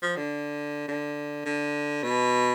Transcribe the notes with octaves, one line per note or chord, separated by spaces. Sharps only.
F3
D3
D3
D3
B2